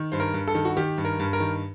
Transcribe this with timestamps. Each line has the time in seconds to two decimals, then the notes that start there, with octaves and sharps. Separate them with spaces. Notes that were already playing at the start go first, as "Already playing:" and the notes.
Already playing: D#3
0.12 G2 C5
0.20 A#4
0.34 G2
0.47 A4
0.55 D#3
0.65 F#4
0.77 D#3 G4
0.98 G2
1.05 A#4
1.19 G2
1.33 A#4
1.40 D#3